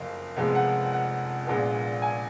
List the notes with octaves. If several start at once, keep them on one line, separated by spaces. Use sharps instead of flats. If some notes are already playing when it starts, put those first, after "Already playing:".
Already playing: F#1 F2 C#3 F5
F1 F2 F3 G#3 B3
F#5
F#5
A#1 A#2 G#3 B3
G#5